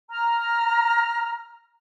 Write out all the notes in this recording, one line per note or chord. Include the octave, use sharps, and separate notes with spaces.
A#5 F6